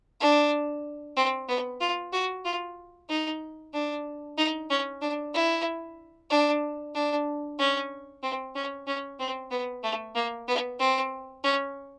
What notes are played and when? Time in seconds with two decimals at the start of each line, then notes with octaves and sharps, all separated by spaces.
0.20 D4
1.17 C4
1.48 B3
1.81 F4
2.13 F#4
2.45 F4
3.09 D#4
3.73 D4
4.37 D#4
4.70 C#4
5.01 D4
5.34 E4
6.30 D4
6.94 D4
7.59 C#4
8.23 C4
8.55 C#4
8.87 C#4
9.19 C4
9.51 B3
9.83 A3
10.15 A#3
10.47 B3
10.80 C4
11.44 C#4